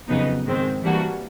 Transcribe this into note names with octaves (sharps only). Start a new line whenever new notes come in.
F2 C#3 F#3 B3 D#4
G#2 D#3 G#3 C4
E3 G3 A#3 D4 F#4